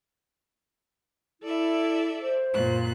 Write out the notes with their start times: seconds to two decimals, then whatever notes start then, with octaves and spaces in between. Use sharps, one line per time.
1.42 E4 A4 D5 E5
2.20 C5
2.53 F#2 A#2 F#6